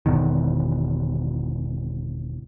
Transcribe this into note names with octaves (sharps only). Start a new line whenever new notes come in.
G1 E2 B2 D#3